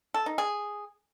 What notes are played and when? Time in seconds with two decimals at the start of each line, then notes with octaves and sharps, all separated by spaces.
0.14 A4
0.26 D#4
0.38 G#4